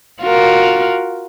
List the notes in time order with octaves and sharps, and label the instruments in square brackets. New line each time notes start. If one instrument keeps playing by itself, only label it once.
[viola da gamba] F4 F#4 A#4